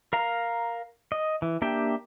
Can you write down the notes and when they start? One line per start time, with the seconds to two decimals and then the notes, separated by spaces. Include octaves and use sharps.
0.13 A#4 F5 A#5
1.12 D#5
1.42 E3
1.62 A#3 D4 G4 E5 G5